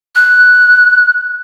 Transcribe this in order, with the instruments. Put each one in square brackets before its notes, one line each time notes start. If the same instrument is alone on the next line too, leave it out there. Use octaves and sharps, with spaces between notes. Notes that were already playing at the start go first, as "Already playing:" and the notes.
[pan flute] F#6